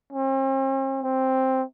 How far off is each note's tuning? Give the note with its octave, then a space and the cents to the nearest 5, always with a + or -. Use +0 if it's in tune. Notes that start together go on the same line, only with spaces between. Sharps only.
C4 +45
C4 +5